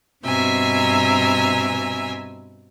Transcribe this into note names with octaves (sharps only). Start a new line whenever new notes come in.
G2 B2 C4 E5 G#5 A#5